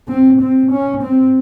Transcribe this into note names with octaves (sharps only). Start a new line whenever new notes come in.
C4
C4
C#4
C4